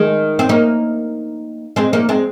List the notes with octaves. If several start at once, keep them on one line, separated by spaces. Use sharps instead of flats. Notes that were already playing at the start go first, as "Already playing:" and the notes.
Already playing: D#3 G#3
C4
A#3 D#4
G#3 C4
A#3 D#4
G#3 C4